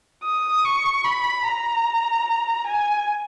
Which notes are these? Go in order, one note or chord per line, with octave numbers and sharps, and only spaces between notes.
D#6
C#6
B5
A#5
G#5